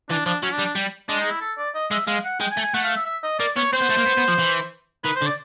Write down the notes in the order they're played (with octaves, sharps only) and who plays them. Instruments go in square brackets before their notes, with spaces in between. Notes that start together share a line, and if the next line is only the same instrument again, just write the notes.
[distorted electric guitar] E3 [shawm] D4
[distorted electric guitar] F3 [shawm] D4
[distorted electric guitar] F#3 [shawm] C#4
[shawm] D4
[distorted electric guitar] G3
[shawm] D4
[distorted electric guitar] G3
[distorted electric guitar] G#3 [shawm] D4
[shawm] D#4
E4
A4
D5
D#5
[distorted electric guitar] G#3 [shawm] E5
[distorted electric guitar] G#3 [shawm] F5
[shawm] F#5
[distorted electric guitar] G#3 [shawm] G5
[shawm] G#5
[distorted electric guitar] A3
[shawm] G#5
[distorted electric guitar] A3 [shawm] F#5
[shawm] F5
E5
E5
D#5
[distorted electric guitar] A#3 [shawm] D5
[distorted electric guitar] B3 [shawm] C#5
[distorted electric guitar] C4 [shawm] C5
[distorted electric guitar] B3
A3
A#3
B3
B3
F3
E3
[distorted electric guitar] D#3 [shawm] B4
[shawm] C5
[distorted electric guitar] D3
[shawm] D5